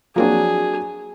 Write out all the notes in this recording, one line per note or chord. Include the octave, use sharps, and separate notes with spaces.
F3 F#3 A#3 C4 D4 G#4